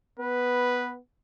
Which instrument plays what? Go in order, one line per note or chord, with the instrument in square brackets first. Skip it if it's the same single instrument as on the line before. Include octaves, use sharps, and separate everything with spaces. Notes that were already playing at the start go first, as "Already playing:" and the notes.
[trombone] B3 [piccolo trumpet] B4